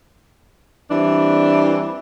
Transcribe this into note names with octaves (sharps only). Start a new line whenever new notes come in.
E3 G3 C4 D4